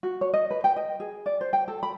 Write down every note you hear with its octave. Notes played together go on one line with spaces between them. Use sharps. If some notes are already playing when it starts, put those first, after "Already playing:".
F#4
C#5
D#5
B4
G5
D#5
G#4
D5
C5
G5
A4
B5